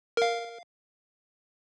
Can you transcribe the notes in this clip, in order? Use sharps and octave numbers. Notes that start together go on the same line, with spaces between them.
A#4 F5